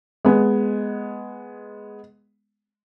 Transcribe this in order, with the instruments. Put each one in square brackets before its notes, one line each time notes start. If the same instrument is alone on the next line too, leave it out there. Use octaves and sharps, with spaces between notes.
[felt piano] G#3 B3